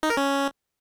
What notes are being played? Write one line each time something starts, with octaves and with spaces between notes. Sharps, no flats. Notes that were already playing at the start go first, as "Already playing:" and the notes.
D#4
A#4
C#4